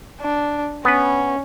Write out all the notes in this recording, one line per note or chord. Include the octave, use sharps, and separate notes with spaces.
D4
B3 C#4 B4